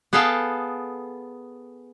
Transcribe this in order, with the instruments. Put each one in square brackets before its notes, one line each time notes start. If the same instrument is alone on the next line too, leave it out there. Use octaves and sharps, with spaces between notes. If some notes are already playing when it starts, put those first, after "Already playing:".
[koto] B3 G#4 A4 F5 G5 A5